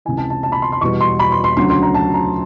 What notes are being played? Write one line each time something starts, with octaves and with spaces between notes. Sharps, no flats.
C#2 C3 E3 G#5
A5
A5
A5
B5
C6
C6
E2 B2 G3 C#6
C6
B5
C6
C6
D2 C#3 F#3 C6
C6
A#5
A5
A#5